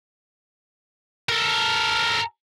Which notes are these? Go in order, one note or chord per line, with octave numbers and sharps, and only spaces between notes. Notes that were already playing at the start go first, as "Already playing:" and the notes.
A4 A#4